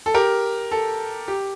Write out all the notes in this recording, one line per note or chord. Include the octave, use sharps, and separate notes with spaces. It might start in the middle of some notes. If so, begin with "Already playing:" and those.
A4
G4 A#4
A4
G4